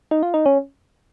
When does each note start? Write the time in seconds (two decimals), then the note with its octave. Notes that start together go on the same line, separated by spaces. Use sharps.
0.11 D#4
0.23 F4
0.34 D#4
0.46 C#4